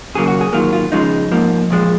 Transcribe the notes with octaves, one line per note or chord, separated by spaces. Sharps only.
D#2 C#3 F#3 A#3 G#4
F#4
G#4
G#2 D#3 F#3 A#3 F4
F4
C#2 C#3 F3 G#3 D#4
G#2 F3 A#3
A#2 F3 G#3